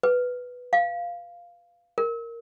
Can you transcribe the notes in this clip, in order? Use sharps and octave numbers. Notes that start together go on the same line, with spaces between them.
B4
F5
A#4